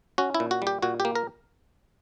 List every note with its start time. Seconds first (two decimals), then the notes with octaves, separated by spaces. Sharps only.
0.18 C#4 F#4
0.35 E4
0.40 A#2
0.51 F#4
0.62 G3
0.67 G4
0.82 A#2 F#4
1.00 G4
1.05 A#3
1.15 A#4